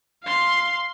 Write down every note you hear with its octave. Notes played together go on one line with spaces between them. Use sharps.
F5 C6